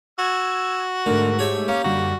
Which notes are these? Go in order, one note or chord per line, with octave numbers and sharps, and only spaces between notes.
F#4 E6 G#6
G#2 D3 A3 A#4
G4 G#4 C#5 E5
A#3 C#4
F#2 D3 G3 F#4